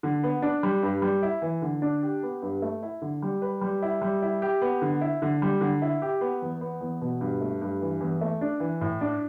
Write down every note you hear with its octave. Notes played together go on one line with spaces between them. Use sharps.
D3
B3
D4
G3
G2
G3
E4
E3
D3
D4
G4
B3
G2
A3
E4
D3
G3
B4
G3
E4
G3
E4
G4
B3
D3
E4
D3
G3
D3
E4
G4
B3
E2
B3
E2
B2
G2
A3
G2
E3
E2
A3
D4
E3
A2
D4